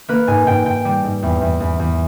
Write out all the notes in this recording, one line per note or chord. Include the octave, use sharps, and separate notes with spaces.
A#3 B4
G#2 G#5
G#2 G5
G#2 G5
G3
G#2
E2
E2
E2
E2